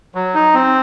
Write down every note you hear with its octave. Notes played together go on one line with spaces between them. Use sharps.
F#3
D#4
C4